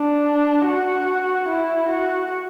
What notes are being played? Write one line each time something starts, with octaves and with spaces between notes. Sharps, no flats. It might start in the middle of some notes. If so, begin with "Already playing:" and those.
Already playing: D4
F#4
E4
F#4